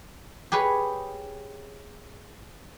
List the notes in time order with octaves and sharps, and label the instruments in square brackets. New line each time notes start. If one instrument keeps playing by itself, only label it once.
[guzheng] G4 G#4 B4 C#5